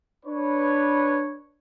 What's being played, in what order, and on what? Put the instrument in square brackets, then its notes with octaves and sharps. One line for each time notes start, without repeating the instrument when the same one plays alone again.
[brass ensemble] D4 B4 C#5